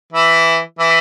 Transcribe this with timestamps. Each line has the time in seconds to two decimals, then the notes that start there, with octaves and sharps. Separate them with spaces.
0.13 E3 E4
0.79 E3 E4